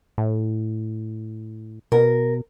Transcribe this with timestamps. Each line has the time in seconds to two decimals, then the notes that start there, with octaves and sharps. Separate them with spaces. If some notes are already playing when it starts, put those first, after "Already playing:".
0.18 A2
1.92 B2 A#4